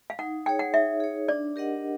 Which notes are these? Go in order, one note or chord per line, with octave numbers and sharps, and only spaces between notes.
F5
D#4 F#5
G#4 C#5 G5
F#5
D#4 E5
G#4 C#5
D4 D5
G4 A#4 D#5 F#5